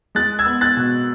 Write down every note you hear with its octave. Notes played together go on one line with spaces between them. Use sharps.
G#3 F#6 A6
E6 G#6
B3
F#6 A6
B2